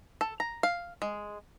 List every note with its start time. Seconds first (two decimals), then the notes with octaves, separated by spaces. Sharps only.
0.21 A4
0.40 A#5
0.63 F5
1.02 G#3